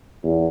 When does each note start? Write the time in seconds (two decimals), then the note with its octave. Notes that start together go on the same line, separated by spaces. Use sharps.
0.24 E2